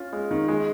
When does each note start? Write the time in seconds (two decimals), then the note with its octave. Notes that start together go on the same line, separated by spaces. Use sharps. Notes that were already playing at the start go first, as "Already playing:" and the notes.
Already playing: C#4 F4
0.13 G#3
0.31 D#3
0.48 G#3